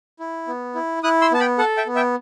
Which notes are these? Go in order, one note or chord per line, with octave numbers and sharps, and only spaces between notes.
E4
B3
E4
E4 D#6 F#6
C6 E6
B3 A5
G5 B5
A4 F#5 A5
E5 G5
B3
E5 G5